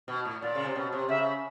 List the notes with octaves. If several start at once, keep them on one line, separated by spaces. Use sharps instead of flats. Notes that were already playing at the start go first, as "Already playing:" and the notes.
B2
A2
A#2 D5
C#3
C3
B2
C3
C#3 E5